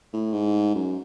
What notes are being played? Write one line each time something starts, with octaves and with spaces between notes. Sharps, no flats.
A2
G#2
F#2